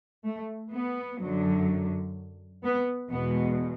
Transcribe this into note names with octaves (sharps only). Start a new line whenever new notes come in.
A3
B3
F#2 D3 F#3
B3
E2 B2 G#3 B3